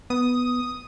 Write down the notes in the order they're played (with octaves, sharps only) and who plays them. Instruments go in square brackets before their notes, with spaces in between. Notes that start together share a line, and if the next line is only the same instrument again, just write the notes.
[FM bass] B3 [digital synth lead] D#6